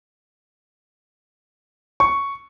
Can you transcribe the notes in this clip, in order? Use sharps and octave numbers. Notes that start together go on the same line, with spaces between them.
C#6